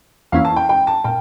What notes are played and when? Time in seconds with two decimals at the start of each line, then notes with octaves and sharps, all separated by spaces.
0.32 E2 E3 A#3 C#4 E4 F5
0.45 A5
0.56 G5
0.69 G5
0.87 A5
1.04 A#2 G5